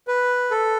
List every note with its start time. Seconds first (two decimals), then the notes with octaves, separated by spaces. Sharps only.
0.08 B4
0.51 A4